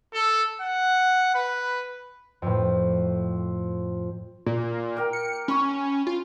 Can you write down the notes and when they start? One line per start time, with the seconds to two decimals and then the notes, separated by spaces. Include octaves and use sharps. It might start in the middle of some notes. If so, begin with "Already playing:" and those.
0.14 A4
0.61 F#5
1.35 B4
2.42 F2 A2
4.46 A#2
4.97 A#3 A#4 G5
5.13 C#7
5.48 C#4 B5 C#6
6.07 F4